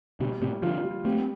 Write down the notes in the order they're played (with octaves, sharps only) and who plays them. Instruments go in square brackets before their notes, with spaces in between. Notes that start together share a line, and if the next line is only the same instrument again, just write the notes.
[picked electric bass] B2 D3 [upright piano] G3
[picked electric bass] A2 C3 [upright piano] G3
[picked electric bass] D3 F3 [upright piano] F4
[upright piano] G3
[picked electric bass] A3 C4 [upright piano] G4